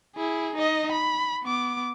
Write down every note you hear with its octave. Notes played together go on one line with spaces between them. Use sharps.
E4 G#4
D#4 D#5
B5
B3 D6